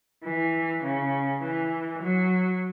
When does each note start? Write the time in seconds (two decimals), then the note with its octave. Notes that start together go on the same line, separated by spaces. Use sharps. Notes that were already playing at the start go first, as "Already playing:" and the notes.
0.24 E3
0.83 C#3
1.42 E3
2.02 F#3